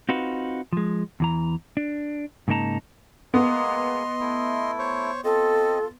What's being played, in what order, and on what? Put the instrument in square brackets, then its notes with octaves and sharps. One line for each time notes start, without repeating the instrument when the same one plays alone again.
[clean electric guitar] C4 D#4 F4 F#4 B4
F3 G#3
E2 E3 A#5
D4
G#2 C#3 A#3 D#4 A5 A#5
[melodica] G#3 A#3 G#4 [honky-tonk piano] B3 [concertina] D#5 C6
[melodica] A3 E4
[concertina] C5 C#5 C#6
[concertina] C4 D#5 [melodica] F4 [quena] A4